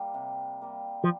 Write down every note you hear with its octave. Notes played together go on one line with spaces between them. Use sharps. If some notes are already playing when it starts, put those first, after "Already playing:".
Already playing: G3 A#3
C3
G3 A#3
F3